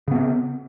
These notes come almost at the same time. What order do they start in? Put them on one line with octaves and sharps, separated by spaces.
C#3 B3 C4